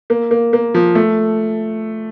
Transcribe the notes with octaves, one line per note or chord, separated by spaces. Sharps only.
A#3
A#3
A#3
F3
A3